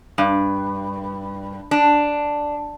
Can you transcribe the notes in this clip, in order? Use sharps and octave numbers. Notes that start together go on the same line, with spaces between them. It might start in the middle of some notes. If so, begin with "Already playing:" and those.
G2
D4